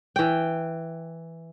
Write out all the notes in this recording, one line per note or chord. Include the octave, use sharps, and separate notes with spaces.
E3 G5